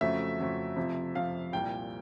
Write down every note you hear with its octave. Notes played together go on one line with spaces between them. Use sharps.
F2 C#3 F#3 A3 E5
F2 C#3 F#3 A3
F2 C3 F3
F2 C3 F3 F5
C2 A#2 G3 G5